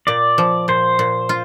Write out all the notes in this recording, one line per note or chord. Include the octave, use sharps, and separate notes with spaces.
A#2 D5
F3
A#2 C5
A#2
F4